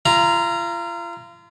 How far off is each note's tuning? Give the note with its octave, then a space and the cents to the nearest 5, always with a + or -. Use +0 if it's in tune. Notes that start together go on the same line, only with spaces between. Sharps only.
F4 -35 A#5 +0